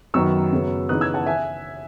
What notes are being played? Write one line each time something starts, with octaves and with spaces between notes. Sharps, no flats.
F#2 D#3 F#3 B3 C#6 E6
F#2 C#3 F#3 B3
C#3 E3 B3 D#4 D#6 F#6
E6 G#6
F#5 A5
E5 G#5